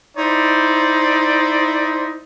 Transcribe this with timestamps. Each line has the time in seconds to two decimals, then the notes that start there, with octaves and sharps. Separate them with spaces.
0.17 D#4 E4 C5 D5